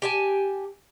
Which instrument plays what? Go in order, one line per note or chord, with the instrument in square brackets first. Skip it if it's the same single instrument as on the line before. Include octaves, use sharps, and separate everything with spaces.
[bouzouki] G4 G#5 A5